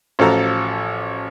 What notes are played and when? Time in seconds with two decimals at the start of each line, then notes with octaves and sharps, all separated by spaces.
0.19 A1 F3 F#4 A4 A#5 E6